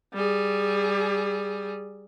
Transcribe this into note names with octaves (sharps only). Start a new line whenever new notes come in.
G3 G#4